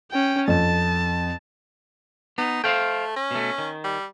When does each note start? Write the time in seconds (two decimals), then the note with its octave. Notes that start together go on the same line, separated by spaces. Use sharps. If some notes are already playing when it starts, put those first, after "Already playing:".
0.11 C#4 G5
0.48 F2 A5
2.38 B3 D#4
2.64 A3 C5 F5 G5
3.16 C#4
3.31 B2 A3
3.58 D#3
3.84 G3